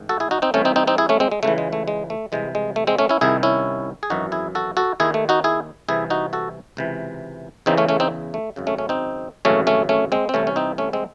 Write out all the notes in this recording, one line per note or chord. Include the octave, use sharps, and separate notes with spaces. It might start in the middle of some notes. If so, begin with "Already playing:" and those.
Already playing: A1 G#2 D#3
F#4 A4
E4 G#4
D#4 F#4
C4 D#4
C2 C3 E3 A3 C#4
C4 D#4
C4 D#4
C4 D#4
E4 G#4
A3 C#4
G#3 C4
G#3
C#2 C#3 E3 A3
G#3
A3
G#3
A3
C2 C3 E3 G#3
G#3
A3
G#3 C4
A3 C#4
C#4 E4
C2 C3 D#3 E4 G#4
C#4 E4
G#4
G#1 F#2 E3 D#4 F#4
E4 G#4
F#4 A4
F#4 A4
D#2 D#3 E4 G#4
A3
D#4 F#4
E4 G#4
C2 C3 E3 E4 G#4
D#4 F#4
F#4 A4
C#2 C3 E3
E2 C#3 E3 C4 D#4
A3 C#4
A3 C#4
C4 D#4
A3
G#1 F#2 C#3
A3 C#4
A3 C#4
C4 D#4
G#1 F#2 C#3 E3 A3 C#4
A3 C#4
A3 C#4
G#3 C4
C4
C2 C3 E3 A3 C#4
C#4
C4 D#4
A3 C#4
G#3 C4